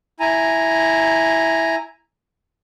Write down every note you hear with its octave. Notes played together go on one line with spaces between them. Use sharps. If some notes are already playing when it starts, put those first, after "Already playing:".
E4 G#5 A#5